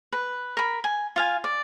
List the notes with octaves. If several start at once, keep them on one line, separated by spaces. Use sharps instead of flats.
B4
A#4 B5
G#5
F4 F5 G#5
D5